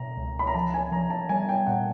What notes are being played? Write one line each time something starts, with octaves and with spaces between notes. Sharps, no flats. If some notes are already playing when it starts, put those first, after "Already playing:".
Already playing: B2 A#5
C#2
B5
A#5
F3 A5
G#5
F3 A#5
A5
G3 G#5
G5
A#2 F#5